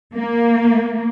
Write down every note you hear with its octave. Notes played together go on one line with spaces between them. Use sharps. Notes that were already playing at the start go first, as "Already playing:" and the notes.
A#3